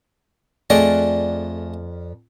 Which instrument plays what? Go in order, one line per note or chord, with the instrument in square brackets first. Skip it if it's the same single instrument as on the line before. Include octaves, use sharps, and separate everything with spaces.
[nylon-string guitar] F2 D5 [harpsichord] A3 G#4 D#5